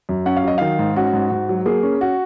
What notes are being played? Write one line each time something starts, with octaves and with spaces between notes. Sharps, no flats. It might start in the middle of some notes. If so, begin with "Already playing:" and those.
F#2
C#4 F#5
F5
F#3 D#5
D#3 F5
G#2
C#4 F#4
G#2
G#2
F#3
A#3 G#4
C#4
F#4